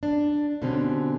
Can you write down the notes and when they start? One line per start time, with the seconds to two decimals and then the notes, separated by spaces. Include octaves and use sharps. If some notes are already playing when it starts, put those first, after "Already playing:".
0.03 D4
0.62 B2 D3 G3 C4 C#4